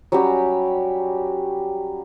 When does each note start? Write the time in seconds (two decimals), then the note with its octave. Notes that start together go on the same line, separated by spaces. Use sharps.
0.12 F#3 G3 C#4 G4